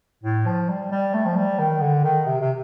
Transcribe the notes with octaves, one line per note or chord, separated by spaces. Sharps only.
A2
F3
G3
G3
A3
F3
G3
D#3
D3
D#3
C3
C3